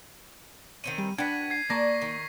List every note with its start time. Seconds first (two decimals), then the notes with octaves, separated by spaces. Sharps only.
0.84 D#3 C4 C#4 D#7
0.98 G3
1.18 D4 F#4 B4 G5 G#6 B6
1.51 G#6 C7
1.70 A#3 D5 A5 C#6 A#6
2.02 D#3